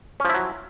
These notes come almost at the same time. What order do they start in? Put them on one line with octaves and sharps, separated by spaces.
C#4 F3 E4 F#3